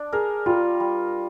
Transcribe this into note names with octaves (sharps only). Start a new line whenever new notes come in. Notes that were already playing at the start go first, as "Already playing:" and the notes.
Already playing: D4
G#4 A#4
G3 F4
G3